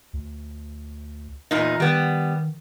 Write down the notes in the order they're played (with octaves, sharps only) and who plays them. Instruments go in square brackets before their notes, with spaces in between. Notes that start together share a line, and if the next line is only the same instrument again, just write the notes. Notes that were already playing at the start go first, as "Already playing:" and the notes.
[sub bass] D2
[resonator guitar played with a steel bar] E2 A#2 D#4
[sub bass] D#3 [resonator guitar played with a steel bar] G3 B3